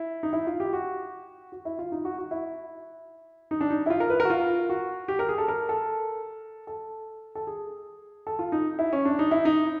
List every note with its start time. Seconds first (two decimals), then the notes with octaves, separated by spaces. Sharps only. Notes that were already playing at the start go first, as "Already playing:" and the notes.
Already playing: E4
0.23 D#4
0.33 E4
0.47 F4
0.60 G4
0.73 F#4
1.52 F#4
1.65 E4
1.79 F4
1.92 D#4
2.05 F#4
2.18 F#4
2.31 E4
3.51 D#4
3.61 D4
3.70 D#4
3.86 E4
3.90 F4
4.00 A#4
4.10 B4
4.20 A#4
4.25 F#4
4.30 F4
4.69 F#4
5.08 G4
5.19 A#4
5.29 G#4
5.38 A4
5.48 A#4
5.69 A4
6.67 A4
7.35 A4
7.47 G#4
8.27 A4
8.39 F4
8.52 D#4
8.79 E4
8.93 C#4
9.05 D4
9.19 D#4
9.31 E4
9.45 D#4